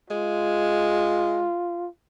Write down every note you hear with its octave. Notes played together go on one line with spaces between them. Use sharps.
G#3 F4